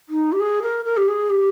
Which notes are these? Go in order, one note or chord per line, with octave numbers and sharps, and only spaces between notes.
D#4
G4
G#4
A#4
A#4
G4
G#4
G4